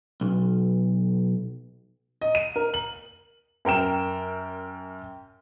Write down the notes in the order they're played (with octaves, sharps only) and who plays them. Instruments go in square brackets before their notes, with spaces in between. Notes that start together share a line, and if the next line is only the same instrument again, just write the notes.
[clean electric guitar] B1
[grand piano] D#5
D#7
A#4
F#7
[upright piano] F#2 A#4 G5 E7